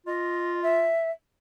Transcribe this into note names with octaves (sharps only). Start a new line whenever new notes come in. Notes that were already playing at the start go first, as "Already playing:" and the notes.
F4 D#5
E5